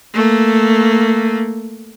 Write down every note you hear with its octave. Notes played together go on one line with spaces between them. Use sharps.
A3 A#3